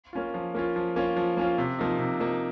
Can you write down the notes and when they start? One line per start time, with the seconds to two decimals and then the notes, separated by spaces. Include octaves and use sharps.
0.13 A#3 C#4 F4
0.34 F3
0.55 A#3 C#4 F4
0.76 F3
0.96 A#3 C#4 F4
1.16 F3
1.37 A#3 C#4 F4
1.58 C3
1.79 F3 A#3 D#4
1.99 C3
2.20 F3 A#3 D#4